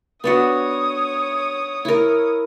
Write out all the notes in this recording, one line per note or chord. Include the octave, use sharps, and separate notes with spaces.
B3 D4 F#4 C#5 D#6
E4 A#4